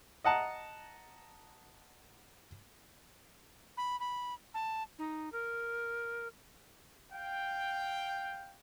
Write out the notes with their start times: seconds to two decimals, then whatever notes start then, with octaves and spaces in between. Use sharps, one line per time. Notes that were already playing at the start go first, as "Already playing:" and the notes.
0.24 D#5 F#5 A5 A#5
3.77 B5
4.00 B5
4.54 A5
4.98 D#4
5.32 A#4
7.11 F5 G5